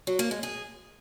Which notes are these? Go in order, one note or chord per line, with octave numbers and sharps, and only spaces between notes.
F#3
A#3
G#3
G#4